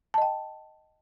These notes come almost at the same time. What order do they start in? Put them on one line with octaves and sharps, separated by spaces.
A5 D#5 G5